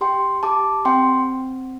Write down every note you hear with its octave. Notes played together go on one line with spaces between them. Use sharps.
G4 G5 C6
G4 A5 D6
C4 G5 C6